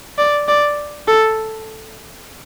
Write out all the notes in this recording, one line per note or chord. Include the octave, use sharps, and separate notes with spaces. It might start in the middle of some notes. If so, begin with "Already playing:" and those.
D5
D5
A4